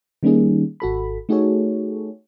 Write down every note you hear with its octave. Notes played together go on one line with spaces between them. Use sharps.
D#3 G3 A#3 C#4 D#4 G#4
G#1 F#4 A4 B5
A3 D#4 F#4 G#4 A4 C#5